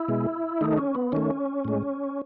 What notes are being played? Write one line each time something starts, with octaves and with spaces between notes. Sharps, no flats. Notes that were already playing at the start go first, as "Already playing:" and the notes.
Already playing: E4
B2 G#3
D#3 A3 D#4
C#4
B3
D#3 A3 C#4
A2 G#3